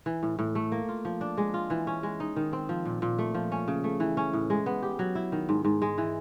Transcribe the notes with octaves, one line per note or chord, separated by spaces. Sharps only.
E3
A2
A2
A3
A#3
F4
F3
D4
G#3
F4
E3
C#4
G#3
D#4
D#3
C4
F3
A#2
A#2
A3
F3
C#4
C#3
A3
E3
C#4
A2
G#3
B3
G4
F#3
E4
D#3
G#2
G#2
G#3
E3